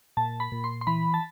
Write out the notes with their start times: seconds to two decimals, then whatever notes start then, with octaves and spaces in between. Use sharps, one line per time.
0.17 A#2 A5
0.40 B5
0.52 A#2
0.64 C6
0.81 C6
0.87 E3 B5
1.14 A5